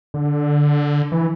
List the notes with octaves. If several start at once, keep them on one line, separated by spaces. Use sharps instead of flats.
D3
E3